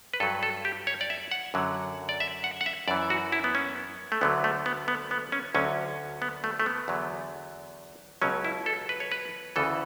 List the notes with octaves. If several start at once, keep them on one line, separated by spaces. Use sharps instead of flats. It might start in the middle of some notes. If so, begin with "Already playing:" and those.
B4
G2 F#3 A4
A4
G4
C#5
D5
E5
F#5
F#2 D3 F#3
D5
E5
F#5
F#5
E5
F#2 E3 D5
F#4
E4
B3
C#4
A3
D2 D3 F#3 B3
A3
B3
B3
B3
C#4
D2 D3 F#3 C#4
B3
A3
A3
B3
E2 D3 F#3
C#2 B2 F#3 C#4
E4
A4
B4
C#5
B4
D2 C#3 E3 A4